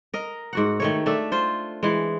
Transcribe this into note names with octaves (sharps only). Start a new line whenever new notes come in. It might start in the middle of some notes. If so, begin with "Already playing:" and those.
A#4 D#5
G#2 F#4 F#5
D#3 A3 C#5
A3 D4 E5
F4 C5
E3 G#3